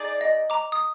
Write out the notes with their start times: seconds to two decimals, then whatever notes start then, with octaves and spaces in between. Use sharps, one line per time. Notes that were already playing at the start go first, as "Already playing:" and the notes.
Already playing: D#4 G#4 D5
0.21 D#5
0.50 A#5 D6
0.72 D#6